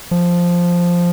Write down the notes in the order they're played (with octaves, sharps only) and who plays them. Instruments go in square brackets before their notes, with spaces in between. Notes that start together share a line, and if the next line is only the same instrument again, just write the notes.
[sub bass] F3